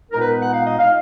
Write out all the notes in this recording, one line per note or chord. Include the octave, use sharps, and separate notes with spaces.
A#2 G#3 B3 D#4 A#4
B4
F#5
F5
D#5
F5